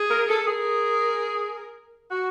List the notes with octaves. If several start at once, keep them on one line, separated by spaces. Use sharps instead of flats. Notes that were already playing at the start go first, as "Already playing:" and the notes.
Already playing: G#4
A#4
A4
G#4 A#4
F#4